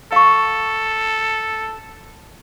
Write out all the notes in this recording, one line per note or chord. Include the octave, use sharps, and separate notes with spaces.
A4 F5 C#6